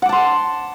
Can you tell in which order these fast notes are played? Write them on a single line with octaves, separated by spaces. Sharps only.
F#5 D6 A5 C6